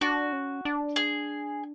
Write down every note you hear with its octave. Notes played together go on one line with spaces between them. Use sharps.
D4 F#4
C#4
D4
G#4